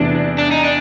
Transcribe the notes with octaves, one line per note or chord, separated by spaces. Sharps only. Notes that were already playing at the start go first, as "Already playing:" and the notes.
Already playing: E2 C3 E3 A3 D4
D4
D#4
D4